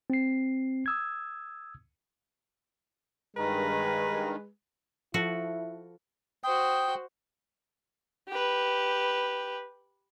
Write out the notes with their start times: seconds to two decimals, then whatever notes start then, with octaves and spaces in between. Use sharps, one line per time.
0.10 C4 C7
0.86 D#6 E6 G#6
3.37 G2 D#3 G#3 B4 A#5
5.14 F3 E4 F#4 A4 B4
6.44 F#4 C5 G5 D#6
8.28 G4 B4